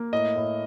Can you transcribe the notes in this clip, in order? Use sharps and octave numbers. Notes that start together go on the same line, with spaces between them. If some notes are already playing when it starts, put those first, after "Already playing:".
Already playing: A#3
A2 D#5
A2